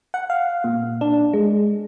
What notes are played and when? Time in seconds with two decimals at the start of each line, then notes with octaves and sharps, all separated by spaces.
0.14 F#5
0.30 F5
0.64 A#2
1.01 D4
1.33 G#3